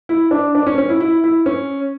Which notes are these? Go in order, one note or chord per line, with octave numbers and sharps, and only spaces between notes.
E4
D4
D4
C#4
C#4
E4
E4
E4
C#4